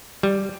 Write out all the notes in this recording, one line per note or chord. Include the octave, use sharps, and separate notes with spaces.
G3